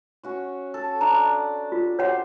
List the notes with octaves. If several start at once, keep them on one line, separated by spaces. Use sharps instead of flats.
C#4 F#4 C#5
A4
D4 A#5
F4
F#4 G4 C5 C#5 F#5